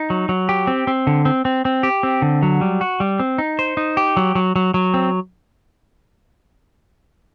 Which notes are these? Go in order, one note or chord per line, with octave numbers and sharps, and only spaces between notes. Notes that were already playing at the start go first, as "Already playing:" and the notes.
Already playing: D#4
F#3
F#3
G4
C4
C4
D3
C4
C4
C4
G4
C4
D3
F#3
G3
F#4
G3
C4
D#4
C5
D#4
G4
F#3
F#3
F#3
F#3
C4